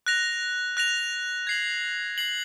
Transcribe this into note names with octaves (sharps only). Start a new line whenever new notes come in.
F#6 A#6 F7
F#6 A#6 F7
G#6 C7 F#7
G#6 C7 F#7